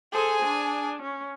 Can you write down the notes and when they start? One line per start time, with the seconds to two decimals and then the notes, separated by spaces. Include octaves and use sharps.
0.12 G#4 A4 C5 G#5
0.42 D4
1.02 C#4